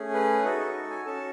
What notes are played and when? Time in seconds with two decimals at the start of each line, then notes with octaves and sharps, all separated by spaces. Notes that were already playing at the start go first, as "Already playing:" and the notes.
Already playing: A3 C#4 G#4
0.14 B4
0.44 D#4 F#4 A4 B4
0.59 D#5
0.90 G#5
1.05 C#4 F#4 A4 A5